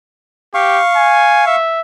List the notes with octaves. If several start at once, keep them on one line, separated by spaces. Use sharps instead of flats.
G4 F5 C#6
G#5
E5